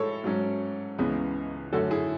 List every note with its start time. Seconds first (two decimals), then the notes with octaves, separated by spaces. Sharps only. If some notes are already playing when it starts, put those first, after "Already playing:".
Already playing: A2 G#3 A4 C#5
0.24 G#2 F#3 C#4
0.98 C#2 C#3 E3 G#3 B3
1.72 F#2 D3 A3 C#4 F#4 A4
1.91 E4 G#4